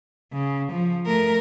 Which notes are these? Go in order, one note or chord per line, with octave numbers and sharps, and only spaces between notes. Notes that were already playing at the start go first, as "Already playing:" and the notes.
C#3
F3
A3 A#4